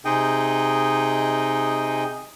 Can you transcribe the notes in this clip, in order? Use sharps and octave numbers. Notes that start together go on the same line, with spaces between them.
C3 D#4 G#4 D#5 G5